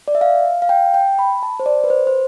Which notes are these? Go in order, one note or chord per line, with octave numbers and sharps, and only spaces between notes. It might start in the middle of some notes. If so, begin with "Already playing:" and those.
D5
E5
F5
F5
G5
G5
B5
A5
C5
D5
B4
C5
C5